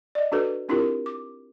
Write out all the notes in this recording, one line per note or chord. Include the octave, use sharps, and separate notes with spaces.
D5 D#5
D4 F#4 A4 B4
C4 D4 E4 F4 G4 A#4
D6